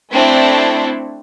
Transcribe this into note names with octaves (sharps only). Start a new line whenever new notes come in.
A3 C4 D4 E4 A4